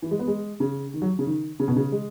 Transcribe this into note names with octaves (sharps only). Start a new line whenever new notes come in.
E3
G#3
B3
G#3
C#3
D#3
F#3
C#3
D#3
C#3
B2
C#3
G#3